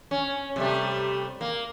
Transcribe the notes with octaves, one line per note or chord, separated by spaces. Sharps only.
C#4
C3 G3 A3
A#3